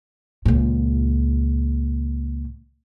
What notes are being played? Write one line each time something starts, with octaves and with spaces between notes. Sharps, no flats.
C#2 A#2